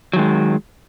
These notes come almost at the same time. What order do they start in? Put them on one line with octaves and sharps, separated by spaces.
F#3 D#3 G#3